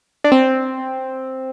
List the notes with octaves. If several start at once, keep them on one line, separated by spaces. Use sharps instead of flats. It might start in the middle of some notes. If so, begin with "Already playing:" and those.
D4
C4